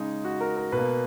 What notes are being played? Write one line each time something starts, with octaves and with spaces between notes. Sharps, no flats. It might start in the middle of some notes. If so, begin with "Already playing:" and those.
Already playing: C#3 G#3 D#4
F#4
A#4
A#4
B2 B4
A#3